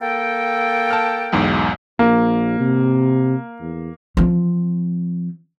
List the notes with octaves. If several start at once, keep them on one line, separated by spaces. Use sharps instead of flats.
A#3 A4 G5
A5 F6
B1 E2 G#2
A#1 A#3
C3
E2
F3 C4